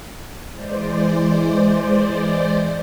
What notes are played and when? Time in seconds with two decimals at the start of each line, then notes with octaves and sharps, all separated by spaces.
0.51 E3 G#3 C5 D5